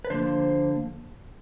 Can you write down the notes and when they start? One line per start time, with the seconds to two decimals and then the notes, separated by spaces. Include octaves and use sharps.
0.05 B4
0.10 D3 F3 A#3 C5